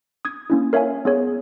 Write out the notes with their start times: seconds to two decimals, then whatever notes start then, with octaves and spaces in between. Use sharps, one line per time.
0.25 D#6 G#6
0.50 A#3 C#4 E4
0.73 A#4 C#5 E5 F5 G#5
1.05 B3 G#4 C#5